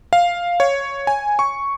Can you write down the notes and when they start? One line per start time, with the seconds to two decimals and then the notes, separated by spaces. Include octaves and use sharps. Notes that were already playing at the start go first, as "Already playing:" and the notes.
0.13 F5
0.60 C#5
1.07 G#5
1.39 C#6